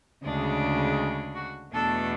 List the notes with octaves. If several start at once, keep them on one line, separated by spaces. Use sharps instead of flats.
D2 C#3 G#3 D4
F#4
E2 B2 A3 D4 A4